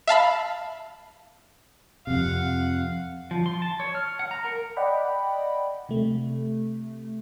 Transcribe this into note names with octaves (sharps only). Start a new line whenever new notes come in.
E5 F5 A5 B5
F2 C3 F5 F#5
F3
C6
A5
C#5
F6
F#5
A#5
A#4
D5 D#5 F#5 G5 B5
C3 A3